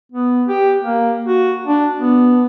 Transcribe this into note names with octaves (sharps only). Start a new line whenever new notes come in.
B3
G4
A#3
F#4
D4
B3